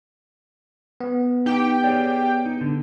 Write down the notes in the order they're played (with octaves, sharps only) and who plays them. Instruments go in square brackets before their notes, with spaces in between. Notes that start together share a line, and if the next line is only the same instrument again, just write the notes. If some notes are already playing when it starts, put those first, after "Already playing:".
[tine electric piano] B3
[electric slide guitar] D#4 [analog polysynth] G4 G5
[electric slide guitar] G#4 C#5 D5
D#4
D3